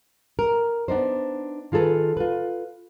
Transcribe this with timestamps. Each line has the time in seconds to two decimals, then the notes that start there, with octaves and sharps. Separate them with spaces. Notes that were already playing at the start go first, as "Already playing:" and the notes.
0.39 A#4
0.88 B3 D4 D#4 C5
1.72 D#3 F4 G#4 A4 B4
2.17 F4 B4